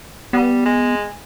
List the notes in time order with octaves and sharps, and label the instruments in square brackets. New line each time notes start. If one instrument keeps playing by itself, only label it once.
[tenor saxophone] G3 [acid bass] B3
[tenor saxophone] G#3